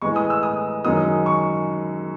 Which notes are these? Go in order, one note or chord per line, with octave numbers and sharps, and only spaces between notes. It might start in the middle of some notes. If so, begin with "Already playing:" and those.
A2 E3 G#3 C#6
D#6
E6
D#6
F#2 D#3 G#3 D#6
C#6